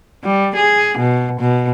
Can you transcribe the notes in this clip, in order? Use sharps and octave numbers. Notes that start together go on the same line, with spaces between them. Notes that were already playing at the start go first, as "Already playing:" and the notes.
G3
G#4
B2
B2